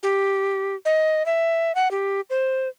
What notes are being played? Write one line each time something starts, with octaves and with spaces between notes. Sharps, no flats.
G4
D#5
E5
F#5
G4
C5